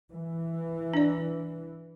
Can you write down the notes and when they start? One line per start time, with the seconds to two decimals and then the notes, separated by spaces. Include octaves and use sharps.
0.12 E3
0.93 D4 D5